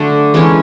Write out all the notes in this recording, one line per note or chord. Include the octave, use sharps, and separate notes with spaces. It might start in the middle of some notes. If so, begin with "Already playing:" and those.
Already playing: D3 F#3 A3 D4
E3 G#3 C#4